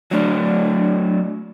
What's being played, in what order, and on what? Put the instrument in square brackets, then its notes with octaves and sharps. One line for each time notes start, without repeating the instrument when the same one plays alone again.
[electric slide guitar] F#3 A3 D5 [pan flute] D4